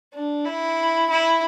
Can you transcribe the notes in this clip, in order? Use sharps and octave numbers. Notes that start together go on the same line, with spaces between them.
D4
E4
E4